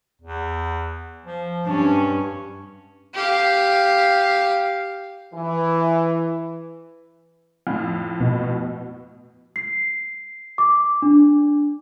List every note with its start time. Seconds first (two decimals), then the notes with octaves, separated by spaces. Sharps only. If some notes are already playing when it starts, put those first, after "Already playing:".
0.21 E2
1.25 F3
1.66 G2 C#4 D4
3.14 G4 F5
5.33 E3
7.67 F2 A2
8.20 B2
9.56 C7
10.58 D6
11.02 D4